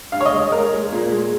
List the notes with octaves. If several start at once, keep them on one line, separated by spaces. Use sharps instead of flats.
G2 F5
C#5
D#5
G#3
G#3 A#4
G#3
A#2
G#3